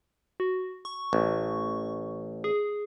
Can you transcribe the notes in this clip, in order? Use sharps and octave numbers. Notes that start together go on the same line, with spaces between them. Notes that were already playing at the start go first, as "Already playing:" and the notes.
F#4
C#6
A1
G#4